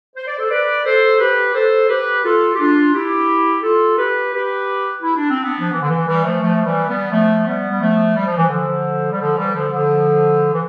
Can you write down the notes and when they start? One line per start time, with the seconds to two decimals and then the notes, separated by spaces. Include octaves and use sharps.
0.16 C5
0.27 D5
0.38 A4 C5
0.50 B4 D5
0.86 A4 C5
1.20 G4 B4
1.54 A4 C5
1.89 G4 B4
2.24 F4 A4
2.55 G4
2.59 D4 F4
2.94 E4 G4
3.63 F4 A4
3.98 G4 B4
4.34 G4 B4
5.02 E4
5.16 D4
5.30 C4
5.43 B3 D4
5.60 F3
5.73 E3
5.82 D3
5.89 E3
6.07 E3 G3
6.24 F3 A3
6.41 F3 A3
6.55 F3
6.65 E3 G3
6.88 G3 B3
7.11 F3 A3
7.46 G3 B3
7.70 G3
7.81 F3 A3
8.16 G3
8.26 F3
8.37 E3
8.48 D3 F3
9.12 G3
9.20 D3 F3
9.37 E3 G3
9.55 D3 F3
9.72 D3 F3
10.53 E3